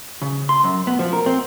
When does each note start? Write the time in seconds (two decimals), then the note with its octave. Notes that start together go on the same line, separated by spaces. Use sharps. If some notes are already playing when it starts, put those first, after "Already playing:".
0.22 C#3
0.49 C6
0.64 F#2
0.87 B3
0.99 F3
1.13 A#4
1.26 C4